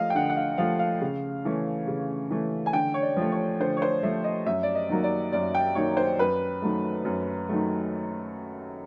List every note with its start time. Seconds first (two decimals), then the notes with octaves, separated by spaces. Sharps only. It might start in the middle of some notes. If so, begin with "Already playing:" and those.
Already playing: F3 A3 D#5 F5
0.10 G5
0.15 D3 F#5
0.30 F#5
0.36 F5
0.58 F3 A3 F5
0.79 F5
1.01 C#3
1.45 E3 A3 C#4
1.87 C#3
2.30 E3 A3 C#4
2.66 G#5
2.73 D3 G5
2.94 C#5
3.02 D5
3.16 F3 A3
3.32 C#5
3.60 D3 C5
3.77 C#5
3.82 C5
4.03 F3 A3 E5
4.24 D#5
4.46 F#2 E5
4.63 D5
4.75 D#5
4.89 D#3 F#3 A#3
5.04 D5
5.32 F#2 D5
5.55 G5
5.75 D#3 F#3 A#3 C#5
5.97 C5
6.19 F#2 B4
6.62 D#3 F#3 A3
7.05 F#2
7.49 D#3 F#3 A3